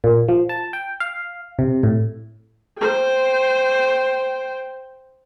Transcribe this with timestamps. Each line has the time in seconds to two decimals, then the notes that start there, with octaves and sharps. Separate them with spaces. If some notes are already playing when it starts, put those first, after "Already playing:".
0.04 A#2
0.28 F3
0.49 A5
0.73 G5
1.00 F5
1.59 C3
1.83 A2
2.79 C5 G5